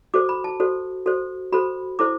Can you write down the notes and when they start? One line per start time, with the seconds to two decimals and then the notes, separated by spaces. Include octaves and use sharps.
0.14 F#4 A4 C5 D6
0.29 B5
0.44 A5
0.60 F#4 A4 C5
1.06 F#4 A4 C5
1.52 F#4 A4 C5 B5
1.99 E4 A4 C5 D6